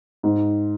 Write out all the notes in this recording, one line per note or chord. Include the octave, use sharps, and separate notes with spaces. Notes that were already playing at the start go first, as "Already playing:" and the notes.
G#2